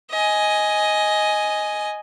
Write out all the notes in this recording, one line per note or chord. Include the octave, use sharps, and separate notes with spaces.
D#5 G#5